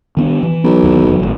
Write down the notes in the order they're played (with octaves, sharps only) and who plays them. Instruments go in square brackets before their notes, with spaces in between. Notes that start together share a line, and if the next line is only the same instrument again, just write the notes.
[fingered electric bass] D#3 B3 D4
E3
[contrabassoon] B1
[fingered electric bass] D#2 E3
F1 F#3
G#1 A2